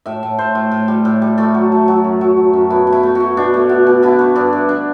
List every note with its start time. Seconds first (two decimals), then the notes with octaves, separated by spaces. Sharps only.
0.06 A2 E5
0.23 A2
0.38 A2 C5
0.55 A2
0.71 A2
0.88 G3
1.05 A2
1.22 G3
1.38 A3 A4
1.54 F#3
1.72 A3
1.88 F#3
2.04 F#2
2.21 F#3
2.37 F#3
2.53 F#2
2.70 B2 E4
2.87 A3
2.93 E4
3.03 A3
3.15 F#4
3.20 A3
3.37 B2 D4
3.54 A3
3.69 B2
3.87 B2
4.03 D3 E4
4.19 A3
4.36 G2 D4
4.53 G2
4.69 D4